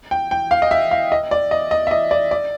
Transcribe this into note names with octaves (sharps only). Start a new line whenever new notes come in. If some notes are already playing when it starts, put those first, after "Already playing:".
G5
G5
F5
D#5
E5
F5
D#5
D5
D#5
D#5
E5
D#5
D5
D5